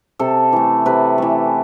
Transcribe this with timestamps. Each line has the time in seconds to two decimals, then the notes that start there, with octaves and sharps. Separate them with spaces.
0.19 C3 A4
0.53 E3 A3
0.86 C3 B4
1.18 E3 A3